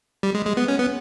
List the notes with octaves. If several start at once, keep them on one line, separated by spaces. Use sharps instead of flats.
G3
G#3
G#3
B3
C#4
B3